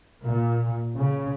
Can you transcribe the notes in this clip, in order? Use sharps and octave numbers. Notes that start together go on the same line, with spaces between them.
A#2
C#3